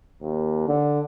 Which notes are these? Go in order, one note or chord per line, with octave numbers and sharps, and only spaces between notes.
D#2
D3